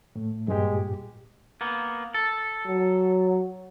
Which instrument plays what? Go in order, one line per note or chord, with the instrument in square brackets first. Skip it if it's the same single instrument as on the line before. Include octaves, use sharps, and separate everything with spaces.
[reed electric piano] A2 A3
[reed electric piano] G2 A#2 G4 [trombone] G#3
[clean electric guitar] A#3 B3
A4
[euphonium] F#3